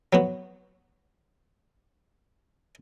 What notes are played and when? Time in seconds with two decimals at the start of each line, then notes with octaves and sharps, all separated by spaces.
0.13 F#3 B3 F#4